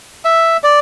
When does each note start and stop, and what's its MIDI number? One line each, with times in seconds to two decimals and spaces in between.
0.25 0.57 76
0.64 0.80 74